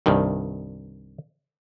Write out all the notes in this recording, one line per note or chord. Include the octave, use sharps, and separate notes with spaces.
C2 G2 D#3